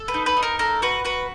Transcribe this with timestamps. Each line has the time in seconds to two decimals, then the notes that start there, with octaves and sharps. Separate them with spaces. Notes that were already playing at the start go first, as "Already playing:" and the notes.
Already playing: A4
0.08 B4
0.14 D#4
0.26 B4
0.37 D#4
0.43 A#4
0.59 A4 A#4
0.82 F#4 B4
1.05 F#4 B4